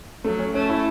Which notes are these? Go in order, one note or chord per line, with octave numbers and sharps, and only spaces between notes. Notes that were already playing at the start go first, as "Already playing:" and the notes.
F#3 A3
C#4
A3 C#4
E4